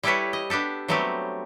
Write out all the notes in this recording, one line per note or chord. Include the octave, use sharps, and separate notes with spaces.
G3 E4 G4 A4 B4 C#5
D#5
B3 D4 G4 A4
F#3 G3 A3 B3 C4 G4